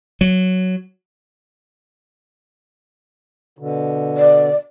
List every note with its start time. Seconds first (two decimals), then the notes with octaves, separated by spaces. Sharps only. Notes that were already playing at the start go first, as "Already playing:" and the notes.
0.21 F#3
3.59 B2 D3
4.17 D5